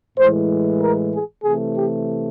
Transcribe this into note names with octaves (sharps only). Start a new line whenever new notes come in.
A2 E3 G#3 C5
A#4
G#4
C3 E3 A3 G#4
G4